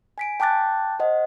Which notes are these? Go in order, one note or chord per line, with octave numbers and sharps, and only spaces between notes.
G#5 B6 D7
G5 A5 D6 F#6 A6
C5 D#5 F#5